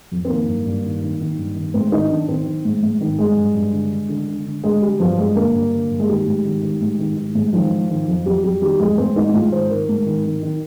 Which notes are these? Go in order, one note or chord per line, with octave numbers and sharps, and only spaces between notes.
F2
C4
D#3 A#3
G2
G2
D#3
D#3
D#3
G2
D#3
G#2 C4
D#3 D#4
D#3 D4
D#3 C4
D#3
G#2
G#2
D#3
G2 G#3
G2
G2
D3
D3
D3
D3
D3
D3 G#3
D3 G3
G2 F3
G2 G#3
D3 A#3
G2
D3
G2
G#3
D#3 G3
G#2
D#3
D#3
G#2
D#3
D#3
G#2
D#3 F3
D#3
D#3
F2
F2 G3
F2 G3
D#3 G3
F2 G#3
G#2 C4
G#2 D#4
G#2 F4
D#3 C5
D#3 A#4
G#2
D#3
D#3
D#3